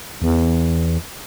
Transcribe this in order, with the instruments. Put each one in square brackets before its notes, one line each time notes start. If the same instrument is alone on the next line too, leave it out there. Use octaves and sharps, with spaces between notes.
[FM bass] E2